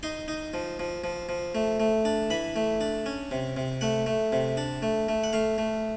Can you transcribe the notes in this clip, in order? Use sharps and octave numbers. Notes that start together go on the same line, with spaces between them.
D#4 C6
D#4
F3
F3
F3
F3
A3
A3
D4
E3 B5
A3
D4
C#4
C3
C3
A3 F#5
A3
C3
D4
A3
A3
F#5
A3 F5
A3